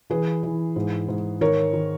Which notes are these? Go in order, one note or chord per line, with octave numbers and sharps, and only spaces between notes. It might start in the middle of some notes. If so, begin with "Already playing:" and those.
E3 G#4 B4
E3
G#2
G#2
D#3 A#4 C#5
D#3